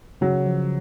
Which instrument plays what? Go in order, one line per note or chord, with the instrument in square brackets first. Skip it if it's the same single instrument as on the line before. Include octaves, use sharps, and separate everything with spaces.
[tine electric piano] C#3 [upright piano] F#3
[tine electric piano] F3